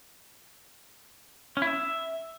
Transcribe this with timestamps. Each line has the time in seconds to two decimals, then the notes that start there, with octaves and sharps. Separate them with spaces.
1.57 C#4
1.62 E4
1.67 E5